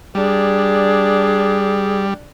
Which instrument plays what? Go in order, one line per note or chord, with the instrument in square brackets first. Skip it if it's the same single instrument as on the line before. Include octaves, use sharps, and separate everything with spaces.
[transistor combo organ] G3 [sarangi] D4 [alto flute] G#4